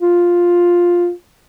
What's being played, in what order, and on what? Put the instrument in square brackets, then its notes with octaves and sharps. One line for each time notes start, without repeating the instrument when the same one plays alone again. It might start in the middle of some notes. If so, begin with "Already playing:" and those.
[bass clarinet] F4